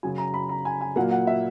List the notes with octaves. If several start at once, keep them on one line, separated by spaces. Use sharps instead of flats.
F#2 C#3 F#3 G#5
A#5
B5
A#5
G#5
G#5
A#2 F#3 A#3 F#5
F#5
E5